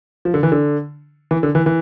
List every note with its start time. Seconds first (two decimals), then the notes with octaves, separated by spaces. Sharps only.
0.25 F3
0.34 D3
0.43 E3
0.52 D3
1.31 E3
1.43 D3
1.55 E3
1.66 E3